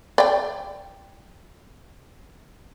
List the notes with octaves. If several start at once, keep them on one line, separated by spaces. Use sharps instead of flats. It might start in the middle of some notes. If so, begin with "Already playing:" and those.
D5 G5